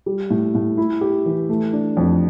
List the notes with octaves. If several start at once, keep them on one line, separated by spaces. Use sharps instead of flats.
G3
A2
A2
E4
G4
E3
A3
D4
F2